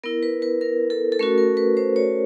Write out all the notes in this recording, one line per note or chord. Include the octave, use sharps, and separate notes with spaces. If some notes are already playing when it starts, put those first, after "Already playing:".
B3 E4 A#4
B4
B4
A#4
A4
A4
A3 C#4 F#4 A#4
A#4
B4
C5
C#5